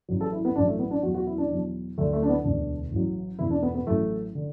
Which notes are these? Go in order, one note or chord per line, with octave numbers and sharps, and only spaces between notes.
A1 A2 F#3
A4
E4
B3
A1 A2 F#3 D4
A3
B3
D4
E2 B2 F#3 F#4
F#4
E4
D4
E2 B2 F#3
D2 D3 F#3 A3
A3
D4
B3
E1 D2 D3 D4
A1 A2 F#3
E1 E2 E3 E4
D4
B3
B3
A1 A2 F#3 A3
D3